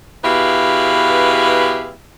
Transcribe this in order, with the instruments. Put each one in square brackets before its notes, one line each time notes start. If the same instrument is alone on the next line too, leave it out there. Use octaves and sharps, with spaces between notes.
[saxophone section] B2 E4 G4 G#4 B4 F5